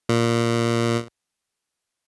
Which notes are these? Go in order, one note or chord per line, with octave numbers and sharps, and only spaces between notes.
A#2